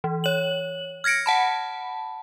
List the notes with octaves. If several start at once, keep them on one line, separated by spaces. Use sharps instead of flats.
E3
C#5 F#7
F6 G#6 A#6 C#7 D7
F#5 A5 B5